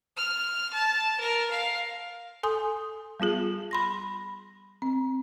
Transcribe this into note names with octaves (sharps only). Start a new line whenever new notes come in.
F6
A5
A#4
F5
A4 G#5 C6 D#6
G3 B3 F4 G#4
B5 C6 A#6
C4